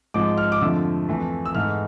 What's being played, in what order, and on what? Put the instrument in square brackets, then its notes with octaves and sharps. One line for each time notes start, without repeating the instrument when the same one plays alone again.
[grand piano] G#2 F3 G#3 D6
F6
D6
F2 D3 F3 A3 E6
F2 E3 A3
E6
G#2 E3 A3 F6